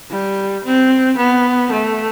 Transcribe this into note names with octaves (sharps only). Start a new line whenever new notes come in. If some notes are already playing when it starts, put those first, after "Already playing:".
G3
C4
B3
A3